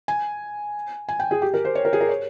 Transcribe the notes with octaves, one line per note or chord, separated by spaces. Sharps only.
G#5
G#5
G5
G#4
G4
A#4
C5
C#5
A#4
G#4
A#4
C#5